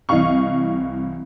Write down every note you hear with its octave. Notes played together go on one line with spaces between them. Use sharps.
C2 E3 D#5 F5 C#6